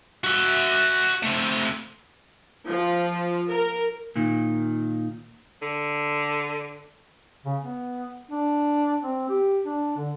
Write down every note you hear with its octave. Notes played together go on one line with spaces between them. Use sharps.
F#4 E5
A3 C4
F3
A#4
A#2 D#3
D3
C#3
B3
D4
C4
G4
D4
D3